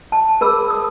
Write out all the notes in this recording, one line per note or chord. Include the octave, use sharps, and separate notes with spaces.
A5
G#4 A#4 B5 E6
D#6